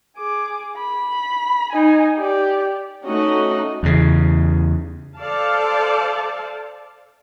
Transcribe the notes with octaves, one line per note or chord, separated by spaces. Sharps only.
G#4 D6
B5
D#4 G#5
G4 D5
A3 C#4 D#4 F#4 D#5
E2 C#3
A4 C5 D5 F5 A5